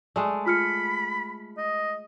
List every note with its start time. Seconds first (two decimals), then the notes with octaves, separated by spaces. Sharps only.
0.16 G#3 A3 D5
0.46 F4 B5 F6 C#7
1.58 D#5